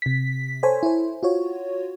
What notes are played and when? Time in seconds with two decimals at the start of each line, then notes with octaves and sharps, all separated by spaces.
0.02 C3 B6
0.63 A4 C5 C#5 G#5
0.83 E4 C5
1.23 F4 F#4 C#5